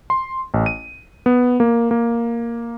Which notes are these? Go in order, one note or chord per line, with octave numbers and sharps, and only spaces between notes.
C6
A1
D#7
B3
A#3
A#3